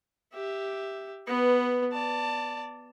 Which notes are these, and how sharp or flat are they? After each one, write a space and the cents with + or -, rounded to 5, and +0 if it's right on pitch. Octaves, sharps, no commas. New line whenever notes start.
G4 +0 E5 +0
B3 +0 B4 +10
D5 -5 A5 +20